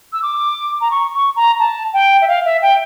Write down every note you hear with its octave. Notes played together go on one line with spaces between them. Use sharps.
E6
D6
A#5
C#6
C#6
A#5
A5
G5
E5
F5
E5
G5